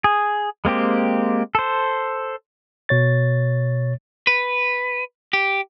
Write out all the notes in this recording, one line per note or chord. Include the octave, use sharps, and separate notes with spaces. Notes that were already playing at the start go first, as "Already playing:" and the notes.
G#4
G#3 A#3 C4 G4
A4 C5
B2 C#5 A6
B4
G4